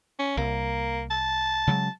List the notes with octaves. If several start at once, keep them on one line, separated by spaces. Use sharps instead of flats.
C#4
C2 A#3
A5
C#3 F#3 G#3